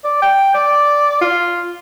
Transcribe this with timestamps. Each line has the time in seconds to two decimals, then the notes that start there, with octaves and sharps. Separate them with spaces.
0.04 D5
0.22 G5
0.54 D5
1.21 F4